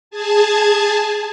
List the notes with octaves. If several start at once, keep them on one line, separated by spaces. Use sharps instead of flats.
G#4 G#5 A5